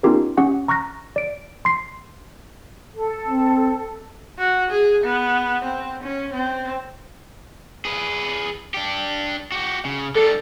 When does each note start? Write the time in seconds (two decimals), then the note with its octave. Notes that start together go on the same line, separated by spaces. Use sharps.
0.03 B3 C#4 D#4 F4 G4 A#4
0.37 C#4 G4 F#5 C#6
0.68 A#5 C#6 F6 F#6 A#6
1.16 D5 D7
1.65 C6 C7
2.93 A4
3.28 C4
4.38 F#4
4.71 G#4
5.04 B3
5.64 C4
6.03 C#4
6.33 C4
7.85 G#4 B4
8.74 D4 G4
9.52 F#4 G4
9.85 C#3
10.16 D3 G3 A4